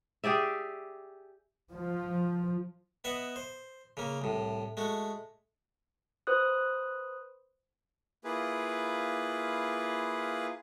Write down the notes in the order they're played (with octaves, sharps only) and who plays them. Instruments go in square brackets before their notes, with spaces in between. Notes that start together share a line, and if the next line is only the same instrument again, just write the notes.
[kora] G4 G#4 D5 E5
[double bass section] F3
[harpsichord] B3 D#5 E5 F#5
C5
C#3 A#3
C2 A2
G#3 A3 F#4
[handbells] B4 C5 D#6 F#6
[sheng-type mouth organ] A#3 E4 F4 G#4 B4